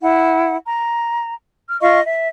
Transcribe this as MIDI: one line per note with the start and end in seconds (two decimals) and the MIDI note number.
0.01 0.56 64
0.01 0.56 78
0.66 1.34 82
1.69 1.80 89
1.81 1.99 65
1.81 1.99 75
1.81 1.99 77
1.81 1.99 85
2.04 2.28 76